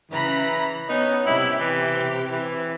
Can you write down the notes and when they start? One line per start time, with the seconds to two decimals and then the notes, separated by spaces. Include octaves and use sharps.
0.11 C#3 E3 A#5 B5
0.89 B3 C#4 D#4
1.26 C3 E4 G4
1.60 E3
2.31 E3